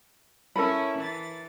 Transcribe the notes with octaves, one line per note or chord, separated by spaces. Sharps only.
C#4 E4 A4 A#4 B5
E3 A6